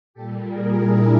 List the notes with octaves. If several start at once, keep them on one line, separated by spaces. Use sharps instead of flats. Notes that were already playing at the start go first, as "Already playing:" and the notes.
A#2 G3 G4 A4
G#4 A#4
D4 E4